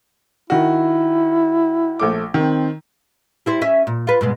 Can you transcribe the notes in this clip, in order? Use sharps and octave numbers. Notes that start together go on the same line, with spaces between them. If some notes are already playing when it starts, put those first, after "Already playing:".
D#3 E4 F#4
A#1 A3 D6
D#3 C4
G3 E4 C5
C#4 E5
A#2
F4 B4
G2 B2 G#3